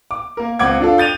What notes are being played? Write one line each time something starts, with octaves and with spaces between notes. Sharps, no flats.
D6
A#3 A#4
C#2 C4 F#5 D6 G#6
D4 F4 A4
G6 A6 D#7 F7